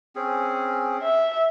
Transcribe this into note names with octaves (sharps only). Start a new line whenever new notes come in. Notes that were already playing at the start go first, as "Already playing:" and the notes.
C4 C#4 G#4
E5